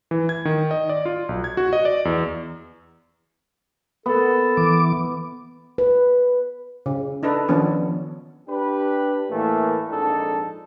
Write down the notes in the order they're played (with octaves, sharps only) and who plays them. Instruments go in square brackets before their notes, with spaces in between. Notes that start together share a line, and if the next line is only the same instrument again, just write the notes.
[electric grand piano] E3
G#6
D#3
D#5
D5
F4
B1
G#6
F#4
D#5
D5
E2
[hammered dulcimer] B3 [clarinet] A4
[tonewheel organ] E3 D6
[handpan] B4
[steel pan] C#3
D4 D#4 A4 B4
D#3 F3 B3 C#4 D4
[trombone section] D4 G4 B4
A2 E3 A3 A#3
A#1 F2 G#2 D4 D#4 A4